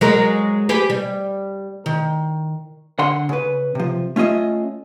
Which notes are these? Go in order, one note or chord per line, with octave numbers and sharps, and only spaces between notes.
F#3 G#3 A#4
G4 G#4 B4
G3
D#3
D3 F#5 C6
C#3 B4
C3 F3
A3 C#4 F4 D#5 E5